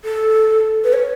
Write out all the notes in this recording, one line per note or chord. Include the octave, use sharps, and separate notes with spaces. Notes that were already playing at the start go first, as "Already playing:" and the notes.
A4
B4
C#5